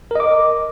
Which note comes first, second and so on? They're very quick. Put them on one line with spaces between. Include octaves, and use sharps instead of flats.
A#4 D#5 D6